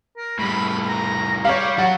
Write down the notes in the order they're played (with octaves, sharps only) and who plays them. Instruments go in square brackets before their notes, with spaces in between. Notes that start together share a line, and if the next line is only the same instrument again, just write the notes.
[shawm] A#4
[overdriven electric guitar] A2 G3 [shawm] B5
[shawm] A#5
[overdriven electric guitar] G3 [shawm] G4 [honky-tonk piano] C#5 F5
[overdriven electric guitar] F#3 F#4 [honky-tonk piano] F#5 [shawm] A5